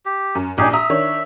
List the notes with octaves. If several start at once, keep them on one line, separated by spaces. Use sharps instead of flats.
G4
F#2
A#1 D4 D#4 G4 G#4
E5 A#5 D#6
D#3 D4 C#5